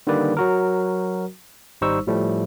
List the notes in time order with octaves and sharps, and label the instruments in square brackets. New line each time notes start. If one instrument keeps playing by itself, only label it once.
[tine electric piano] D3 D#3 G3 A#3 B4 D5
F#3 F#4 A#4
G#1 G3 D#4 C5 C#6 E6
A2 F3 G3 A3